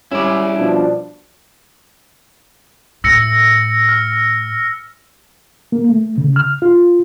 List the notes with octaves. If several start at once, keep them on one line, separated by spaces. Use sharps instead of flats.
G3 C#4 E4 D5
B2 F3 D4
A2 E6 A#6 C#7
F6
A#3
A3
C#3
F6
F4